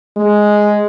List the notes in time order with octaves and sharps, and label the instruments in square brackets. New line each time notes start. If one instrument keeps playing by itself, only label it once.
[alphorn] G#3